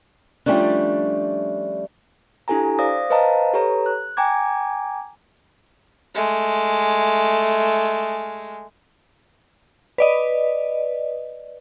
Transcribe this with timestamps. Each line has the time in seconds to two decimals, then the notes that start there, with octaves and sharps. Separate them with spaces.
0.46 F3 G3 A3 C#4 D4
2.48 D4 E4 G4 A4 G#5 A#5
2.79 C5 D5 F5 D#6 A#6
3.10 B4 C5 D#5 F5 A5 A#5
3.53 G4 A4 B4 C#5 A#5
3.86 F#6
4.17 G5 G#5 A#5 D6 G#6
6.15 G#3 A3
9.98 B4 D5 D#5